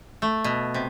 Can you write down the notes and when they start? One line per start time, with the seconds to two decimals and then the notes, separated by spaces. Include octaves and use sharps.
0.22 A3
0.44 B2
0.74 C3